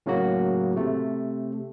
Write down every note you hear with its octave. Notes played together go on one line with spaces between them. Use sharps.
A2 C#3 F#3 A#3 F#4
C3 A3